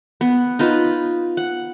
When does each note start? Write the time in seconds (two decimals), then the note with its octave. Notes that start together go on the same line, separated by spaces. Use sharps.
0.21 B3
0.59 D#4 F4 B4
1.37 F#5